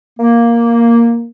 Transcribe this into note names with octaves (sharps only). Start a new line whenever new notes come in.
A#3